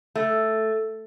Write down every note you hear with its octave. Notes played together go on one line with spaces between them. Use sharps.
A3